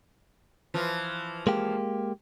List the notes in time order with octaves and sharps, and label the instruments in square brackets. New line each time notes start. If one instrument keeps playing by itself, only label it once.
[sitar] E3 F3 F4
[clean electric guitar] G#3 A#3 G4